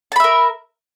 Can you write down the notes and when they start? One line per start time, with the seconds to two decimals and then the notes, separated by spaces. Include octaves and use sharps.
0.12 A5
0.16 B5
0.20 E5
0.24 A#4